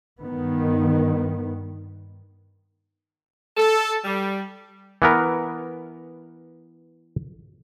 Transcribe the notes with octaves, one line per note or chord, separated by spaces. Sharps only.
G2 D#3 B3
A4
G3
E3 B3 A#4